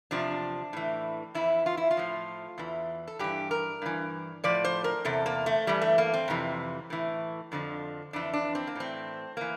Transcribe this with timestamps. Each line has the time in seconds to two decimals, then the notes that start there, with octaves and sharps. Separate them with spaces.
0.11 E2 C3 F3 D4
0.73 A2 E3
1.34 F2 E3 E4
1.66 F4
1.77 E4
1.91 F4
1.97 A2 F3
2.58 E2 E3
3.08 A4
3.19 G2 E3 G4
3.51 A#4
3.82 G2 E3
4.44 A2 F3 D5
4.64 C5
4.84 A#4
5.05 E2 C3 A4
5.26 A#3
5.46 A3
5.67 G2 E3 G3
5.82 A3
5.98 A#3
6.14 C4
6.28 F2 C3 E3
6.90 A2 E3
7.52 F2 D3 F3
8.13 F2 E3 D4
8.33 D4
8.55 C4
8.67 A#3
8.75 A2 E3 C4
9.37 E3 A#3